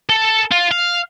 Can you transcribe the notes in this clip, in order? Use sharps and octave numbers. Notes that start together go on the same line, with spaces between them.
A4
F4
F5